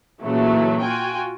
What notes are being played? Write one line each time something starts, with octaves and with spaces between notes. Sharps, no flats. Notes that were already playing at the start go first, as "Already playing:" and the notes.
A#2 C#3 E3 F#3 A3
F4 F#4 G5 G#5